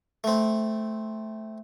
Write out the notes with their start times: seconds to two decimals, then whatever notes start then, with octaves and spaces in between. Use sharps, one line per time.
0.24 A3 C4